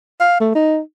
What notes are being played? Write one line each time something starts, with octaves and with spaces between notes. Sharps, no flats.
F5
A3
D#4